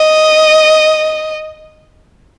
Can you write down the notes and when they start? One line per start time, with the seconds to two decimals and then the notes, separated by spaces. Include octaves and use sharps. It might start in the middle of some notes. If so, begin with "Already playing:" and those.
Already playing: D#5